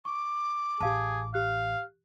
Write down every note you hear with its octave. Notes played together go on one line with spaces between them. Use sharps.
C#6 D6
A1 G4 G#4 F5 A5
G4 F5 F#6